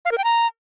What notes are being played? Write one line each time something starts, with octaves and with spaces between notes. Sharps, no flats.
F5
A#4
G5
A#5